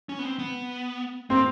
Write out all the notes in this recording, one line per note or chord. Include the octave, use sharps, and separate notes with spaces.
C#4
B3
C4
B3
A#3 C4